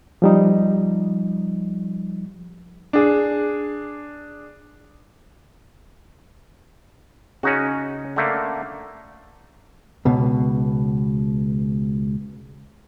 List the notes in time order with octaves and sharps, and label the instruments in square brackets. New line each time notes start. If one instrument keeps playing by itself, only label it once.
[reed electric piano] F3 G3 D#4
[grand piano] D4 G#4
[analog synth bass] C#3 [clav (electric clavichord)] C#4 D#4 F#4
[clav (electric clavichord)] D3 A3 A#3
[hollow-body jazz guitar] C#2 B2